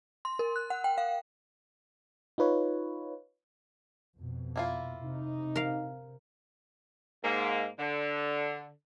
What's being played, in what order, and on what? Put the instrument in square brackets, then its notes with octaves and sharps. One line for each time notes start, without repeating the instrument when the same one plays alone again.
[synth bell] C6
A#4
F#6
F#5
G5
F5
[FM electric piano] D#4 F4 B4 C#5
[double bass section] F2 B2
[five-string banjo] A#3 E4 F4
[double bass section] C3 [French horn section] D#4
[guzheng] A#4 F5
[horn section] G#2 A#3
D3